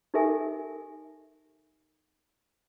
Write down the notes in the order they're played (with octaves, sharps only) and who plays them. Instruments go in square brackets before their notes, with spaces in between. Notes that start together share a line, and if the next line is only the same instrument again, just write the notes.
[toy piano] D#4 G4 A4 A#4 E5 G#5